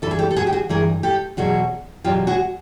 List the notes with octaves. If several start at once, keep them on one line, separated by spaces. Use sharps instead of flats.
G2 E3 G#4 A4 B4
G4 A4
A4
F#4 G#4
G4
F#4 G#4
G2 E3 G#4 A#4
G4 A4
E2 B2 F#3 F#4 G#4
E2 B2 F#3 F4 G4
F#4 G#4